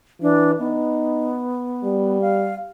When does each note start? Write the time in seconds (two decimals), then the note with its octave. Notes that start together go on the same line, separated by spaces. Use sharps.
0.22 E3 D4
0.59 B3 D#4
1.84 G3
2.21 F5